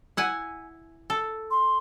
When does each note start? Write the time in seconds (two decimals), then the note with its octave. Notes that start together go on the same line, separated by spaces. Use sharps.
0.17 E4 F#5 G#5
1.10 A4
1.51 C6